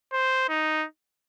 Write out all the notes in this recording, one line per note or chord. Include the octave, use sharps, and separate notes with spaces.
C5
D#4